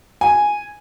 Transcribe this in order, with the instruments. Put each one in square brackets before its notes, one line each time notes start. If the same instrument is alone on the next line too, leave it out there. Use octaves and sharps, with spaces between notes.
[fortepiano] G#5